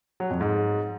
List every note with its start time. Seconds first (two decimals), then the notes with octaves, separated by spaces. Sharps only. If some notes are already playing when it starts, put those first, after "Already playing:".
0.20 F#3
0.30 F2
0.41 G#2